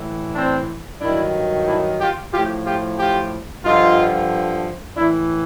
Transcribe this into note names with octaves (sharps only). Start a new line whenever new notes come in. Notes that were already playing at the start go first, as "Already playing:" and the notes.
Already playing: A2 E3
C4 D4
G2 D#3 F#3 D4 E4
D4 E4
F4 G4
A2 F3 F4 G4
F4 G4
F4 G4
G2 D3 F3 D#4 F4
A2 E3 D4 E4